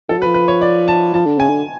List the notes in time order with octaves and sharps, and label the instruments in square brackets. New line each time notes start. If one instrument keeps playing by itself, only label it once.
[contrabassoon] F3 [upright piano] A4
[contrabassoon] F#3
[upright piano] B4
[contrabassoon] F3
[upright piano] B4
C#5
D5
A5
[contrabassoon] F3 [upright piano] A5
[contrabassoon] D3
[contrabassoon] C#3 [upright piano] G#5
[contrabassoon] D3